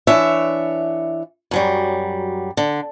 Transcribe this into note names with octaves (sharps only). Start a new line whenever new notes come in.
E3 D4 C#5 E5
F#2 F#3 G3
D3